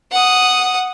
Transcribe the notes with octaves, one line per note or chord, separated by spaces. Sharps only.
F#5 D#6